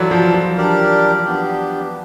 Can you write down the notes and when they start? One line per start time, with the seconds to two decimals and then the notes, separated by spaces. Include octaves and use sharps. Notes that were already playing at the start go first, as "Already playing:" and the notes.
Already playing: E3 F#3 F4 A4 D5
0.11 F3
0.34 F3
0.58 D4 G4 A#4 D5
1.25 B3 D4 G4